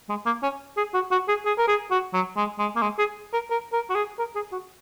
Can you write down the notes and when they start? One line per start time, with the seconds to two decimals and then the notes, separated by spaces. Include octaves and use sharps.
0.09 G#3
0.26 A#3
0.43 C#4
0.77 G#4
0.94 F#4
1.11 F#4
1.28 G#4
1.45 G#4
1.58 A#4
1.68 G#4
1.91 F#4
2.13 F#3
2.37 G#3
2.59 G#3
2.76 A#3
2.82 G#3
2.98 G#4
3.33 A#4
3.51 A#4
3.73 A#4
3.90 F#4
3.95 G#4
4.19 A#4
4.35 G#4
4.52 F#4